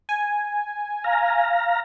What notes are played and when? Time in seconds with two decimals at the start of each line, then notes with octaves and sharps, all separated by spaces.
0.09 G#5
1.04 F5 A#5